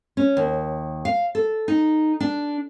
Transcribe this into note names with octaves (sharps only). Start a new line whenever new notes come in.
C#4
D#2
F5
A4
D#4
D4